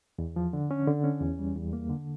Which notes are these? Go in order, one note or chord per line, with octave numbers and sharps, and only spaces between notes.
E2
F3
D3
C#4
D3
C#4
E2
G3
E2
A#3
D3